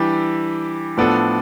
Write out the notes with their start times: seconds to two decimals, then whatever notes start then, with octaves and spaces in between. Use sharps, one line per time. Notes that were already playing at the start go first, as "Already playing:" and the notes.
Already playing: E3 G3 D4 G4
0.97 A2 F3 B3 D4 A4